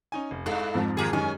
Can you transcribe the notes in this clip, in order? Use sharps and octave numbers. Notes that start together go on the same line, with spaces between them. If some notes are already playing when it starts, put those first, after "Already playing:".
C#4 D#4 G#5
F1
G2 G#3 E4 A4 F5
F2 G#2 F3
D#3 F4 G4 G#4 A#5
F#2 D#3 G#3 C#4 G#5